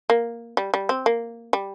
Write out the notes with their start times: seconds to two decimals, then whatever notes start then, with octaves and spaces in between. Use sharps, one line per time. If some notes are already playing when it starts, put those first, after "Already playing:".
0.10 A#3
0.57 G3
0.74 G3
0.89 C4
1.06 A#3
1.53 G3